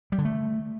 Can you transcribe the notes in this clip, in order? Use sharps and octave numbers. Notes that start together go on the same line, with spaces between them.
G3
D3
A3